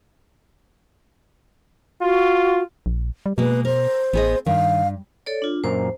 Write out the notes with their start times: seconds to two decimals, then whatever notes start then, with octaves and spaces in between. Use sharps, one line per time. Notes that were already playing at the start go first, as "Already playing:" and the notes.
2.02 F4 F#4
2.86 A#1
3.26 G3
3.38 B2 G#3 A#3 B4
3.65 A#4 C5
4.13 A1 B3 G#4 D#5
4.46 G2 D#3 F5
5.26 A4 C#5 D5
5.42 D4 F4
5.64 F#2 A#2 A#4 C5